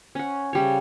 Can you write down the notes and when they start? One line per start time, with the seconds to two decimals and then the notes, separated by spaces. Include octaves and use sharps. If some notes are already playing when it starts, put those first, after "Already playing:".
0.15 C#4 F#5
0.53 C#3 G3 C#5